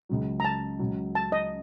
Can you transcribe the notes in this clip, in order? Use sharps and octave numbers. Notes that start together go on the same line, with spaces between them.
C#2 C#3 F#3
A#5
A5
C#2 C#3 F#3
A5
D#5